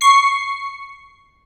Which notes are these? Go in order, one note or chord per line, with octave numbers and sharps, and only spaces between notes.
C#6 C7